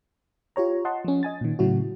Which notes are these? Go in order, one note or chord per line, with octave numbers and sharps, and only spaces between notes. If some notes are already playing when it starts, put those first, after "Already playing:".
F4 G4 C#5 A#5
D#5 F#5 A5 C6
F3 C#4
D#5 G#5 A6
A#2 D#3
A2 C#3 F#3 E4 F#4